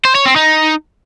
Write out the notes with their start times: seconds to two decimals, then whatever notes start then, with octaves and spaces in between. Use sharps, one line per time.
0.05 C5
0.15 C#5
0.26 C4
0.36 D#4